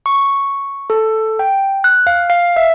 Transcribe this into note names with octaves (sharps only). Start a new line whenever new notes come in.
C#6
A4
G5
F#6
F5
F5
E5